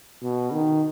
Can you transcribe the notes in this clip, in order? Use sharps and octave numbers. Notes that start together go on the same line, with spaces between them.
B2
D#3